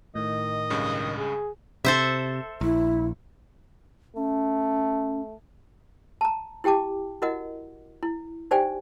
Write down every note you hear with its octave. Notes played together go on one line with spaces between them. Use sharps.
A2 D#3 D#5
C#2 G2 C#3
G#4
C3 A4 C5 E5
A#1 E4
A3 C#4
A5 A#5
E4 G4 G5 A5 D6
E4 F#4 A#4 D#5 F#5
E4
D#4 G4 C5 D5 G5 G#5